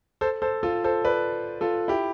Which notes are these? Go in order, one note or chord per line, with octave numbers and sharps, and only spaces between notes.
A4 C5
A4 C5
F4 A4
A4 C5
B4 D5
F4 A4
E4 G4